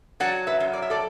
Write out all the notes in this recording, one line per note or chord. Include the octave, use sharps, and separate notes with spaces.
F#3 D5 F#5
B4 E5
F#2
D5
E5
A4 D5